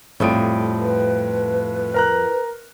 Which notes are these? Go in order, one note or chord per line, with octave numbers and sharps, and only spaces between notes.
F2 A2 F3 G3 D#6 D7
B4
A#4 A#5 F#6